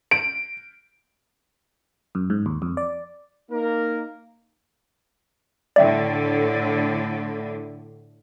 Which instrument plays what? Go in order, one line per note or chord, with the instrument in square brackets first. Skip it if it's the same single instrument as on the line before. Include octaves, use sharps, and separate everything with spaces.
[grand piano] D7
[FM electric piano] F#2
G#2
D#2
F2
D5
[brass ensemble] A#3 D#4 A#4
[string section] A2 D3 [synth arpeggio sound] D5 E5 G5